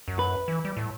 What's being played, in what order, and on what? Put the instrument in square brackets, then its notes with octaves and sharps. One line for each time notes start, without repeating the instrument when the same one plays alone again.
[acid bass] F#2
[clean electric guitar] B4
[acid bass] E3
G3
A2